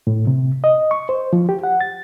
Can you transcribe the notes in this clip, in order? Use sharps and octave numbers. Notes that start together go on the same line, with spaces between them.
A2
C3
D#5
C#6
C5
F3
G4
F#5
A6